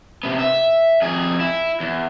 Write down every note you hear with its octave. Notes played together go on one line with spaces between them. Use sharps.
C3 B3
E5
F2 G#4
E4
E2